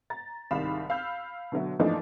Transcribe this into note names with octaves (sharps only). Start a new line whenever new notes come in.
A#5 A6
C2 G#2 D#3 F5 B5 E7
F5 B5 E6 F6 G6
B2 D3 F#3 E5
E3 F3 A3 A#3 D4 D#4